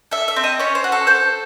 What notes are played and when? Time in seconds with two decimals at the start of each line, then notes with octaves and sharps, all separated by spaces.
0.11 A4 E5
0.28 E5
0.36 C4
0.44 D#5
0.59 C#4 C#5
0.75 C5
0.84 F#4
0.92 A4
1.07 A4 C5